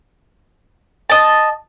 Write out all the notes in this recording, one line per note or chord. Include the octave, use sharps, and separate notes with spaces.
D#5 A5